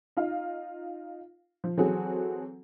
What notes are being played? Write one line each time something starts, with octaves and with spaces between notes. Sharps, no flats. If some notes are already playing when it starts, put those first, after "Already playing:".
D#4 F4 F5
F3
E3 F#3 C4 F#4 G#4 A4